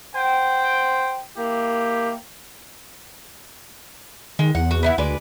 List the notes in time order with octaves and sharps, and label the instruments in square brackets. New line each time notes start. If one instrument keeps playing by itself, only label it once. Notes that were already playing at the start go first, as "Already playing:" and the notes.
[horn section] C5 F#5 G5
A#3 E4 G4
[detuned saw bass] D#3 [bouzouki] G#3
[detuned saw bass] E2 [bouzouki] F#5
[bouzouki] F#4
B3 D#4 E4
[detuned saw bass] D2 [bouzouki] G#3 B4 D5